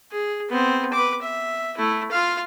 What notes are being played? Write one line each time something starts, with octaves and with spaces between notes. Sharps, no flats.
G#4
B3 C4
B4 D6
E5
A3 E4
F4 F5